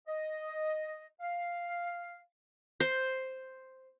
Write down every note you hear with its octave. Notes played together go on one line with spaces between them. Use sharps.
D#5
F5
C5